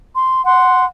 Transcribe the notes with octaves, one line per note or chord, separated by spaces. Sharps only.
C6
F#5 C6